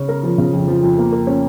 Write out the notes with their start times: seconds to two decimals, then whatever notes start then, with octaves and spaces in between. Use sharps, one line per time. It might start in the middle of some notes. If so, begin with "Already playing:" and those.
Already playing: C#3 C#4 C#5
0.09 A#4
0.23 F3
0.38 C#3
0.53 F2
0.68 F3
0.83 F2
0.98 A#3
1.12 A#4
1.27 C#4